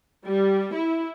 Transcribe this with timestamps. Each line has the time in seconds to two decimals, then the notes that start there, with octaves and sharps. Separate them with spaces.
0.24 G3
0.73 E4